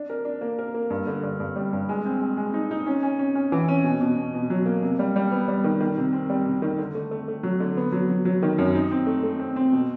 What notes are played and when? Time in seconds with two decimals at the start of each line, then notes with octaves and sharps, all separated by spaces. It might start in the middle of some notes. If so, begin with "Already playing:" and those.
Already playing: D4
0.10 A#4
0.25 D4
0.41 A#3
0.59 A#4
0.74 A#3
0.90 G2
1.07 D3
1.23 G2
1.40 G2
1.56 G3
1.73 G2
1.89 G#3
2.05 C4
2.21 G#3
2.37 G#3
2.54 D#4
2.71 D#4
2.86 C#4
3.03 C#4
3.19 C#4
3.35 C#4
3.52 E3
3.68 C#4
3.84 B2
4.01 B2
4.17 B2
4.34 B2
4.50 F#3
4.66 A#3
4.83 C3
4.99 G3
5.16 G3
5.32 B3
5.48 G3
5.64 D#3
5.80 D#3
5.98 C3
6.13 C4
6.30 G3
6.46 C3
6.62 D#3
6.78 D3
6.95 A3
7.11 A3
7.28 A3
7.43 F#3
7.60 D3
7.77 B3
7.92 F#3
8.10 F#3
8.25 F#3
8.43 D#3
8.58 F#2
8.75 D#4
8.91 C4
9.07 A3
9.23 A3
9.40 C4
9.56 C4
9.72 B2